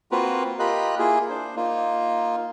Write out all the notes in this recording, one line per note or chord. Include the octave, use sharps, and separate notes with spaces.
A#3 C4 F4 F#4 A#4 B4
F4 G4 A#4 D#5 B5 F#6
A#3 E4 F4 G#4
D4 C5
A#3 D#4 F4